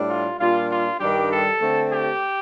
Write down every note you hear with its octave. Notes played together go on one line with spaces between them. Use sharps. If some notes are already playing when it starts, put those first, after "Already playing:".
Already playing: A2 G3 D4
F4
A#2 G3 D4 F4
F4
G2 D#3 G3 D4 G4
A4
D3 A3 C4
G4